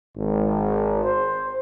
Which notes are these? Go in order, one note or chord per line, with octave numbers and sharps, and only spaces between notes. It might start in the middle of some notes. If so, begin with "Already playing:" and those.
G#1
C5